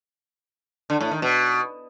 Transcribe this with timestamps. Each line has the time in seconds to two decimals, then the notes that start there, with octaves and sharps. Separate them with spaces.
0.90 D3
1.01 A2
1.11 D#3
1.22 B2